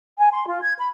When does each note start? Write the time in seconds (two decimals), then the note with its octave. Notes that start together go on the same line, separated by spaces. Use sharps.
0.18 G#5
0.32 C6
0.46 F4
0.61 G#6
0.78 B5